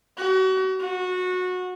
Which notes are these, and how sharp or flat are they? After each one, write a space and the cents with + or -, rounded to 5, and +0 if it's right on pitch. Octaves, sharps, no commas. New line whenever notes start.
F#4 +35
F#4 -20